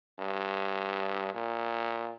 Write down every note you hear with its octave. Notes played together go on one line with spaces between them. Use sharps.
G2
A#2